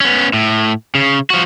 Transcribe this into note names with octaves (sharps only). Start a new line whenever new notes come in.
B3 C#4
A2
C#3
F3 F#4